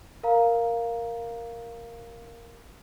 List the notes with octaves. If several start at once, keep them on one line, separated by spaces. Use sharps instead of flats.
A#4 F5 A#5